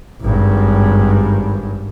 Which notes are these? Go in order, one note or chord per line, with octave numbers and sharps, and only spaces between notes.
G#1 G2